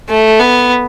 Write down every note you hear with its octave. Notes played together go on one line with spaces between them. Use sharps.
A3
B3